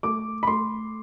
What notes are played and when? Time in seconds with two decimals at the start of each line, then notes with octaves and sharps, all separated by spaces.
0.03 A3 D6
0.43 B5
0.47 A3 C6